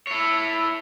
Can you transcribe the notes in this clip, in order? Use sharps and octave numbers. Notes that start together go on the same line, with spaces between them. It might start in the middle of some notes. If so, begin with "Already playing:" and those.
E4 C#5